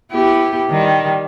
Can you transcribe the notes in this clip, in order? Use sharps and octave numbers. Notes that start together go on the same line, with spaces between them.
B3 E4 G4
D#3 G3